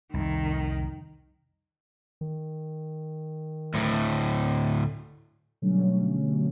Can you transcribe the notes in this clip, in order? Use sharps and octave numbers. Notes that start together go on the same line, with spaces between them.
C2 F2 D#3
D#3
D2 A2
B2 D3 F#3 G3 A3 C#4